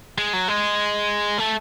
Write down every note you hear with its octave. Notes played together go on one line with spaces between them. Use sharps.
G#3
F#3
G#3
A3